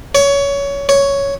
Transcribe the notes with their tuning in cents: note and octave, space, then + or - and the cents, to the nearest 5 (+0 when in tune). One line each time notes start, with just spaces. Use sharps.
C#5 +20
C#5 +5